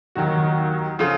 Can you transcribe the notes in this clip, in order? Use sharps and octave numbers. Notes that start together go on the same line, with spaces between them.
D#2 D#3 F#3 F#4
C#3 F3 F4 A4